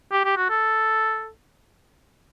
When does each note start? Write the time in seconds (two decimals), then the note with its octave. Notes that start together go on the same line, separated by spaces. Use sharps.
0.11 G4
0.24 G4
0.37 F#4
0.50 A4